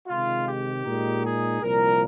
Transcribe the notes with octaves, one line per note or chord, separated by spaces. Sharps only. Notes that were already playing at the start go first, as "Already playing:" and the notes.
C3 D#3 G#3 F4
G4
A#2 G#3 D#4
G#4
C2 A#2 F3 A#4